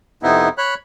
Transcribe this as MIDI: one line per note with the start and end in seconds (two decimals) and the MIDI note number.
0.23 0.49 41
0.23 0.49 48
0.23 0.49 59
0.23 0.49 63
0.23 0.49 64
0.58 0.74 73
0.58 0.74 83
0.58 0.74 90